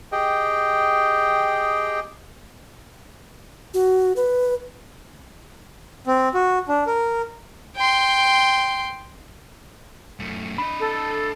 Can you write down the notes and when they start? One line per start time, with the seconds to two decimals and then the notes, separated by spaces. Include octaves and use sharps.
0.12 G4 G#4 D#5 G5
3.74 F#4
4.16 B4
6.07 C4
6.34 F#4
6.68 D4
6.87 A#4
7.76 G5 C6
10.20 F#2 A3
10.58 D4 D#5 B5
10.79 A4